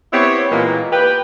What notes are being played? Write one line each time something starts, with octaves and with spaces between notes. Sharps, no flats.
B3 C4 E4 G4 C#5
A#2 E3 G#3 A#3
G4 B4 G5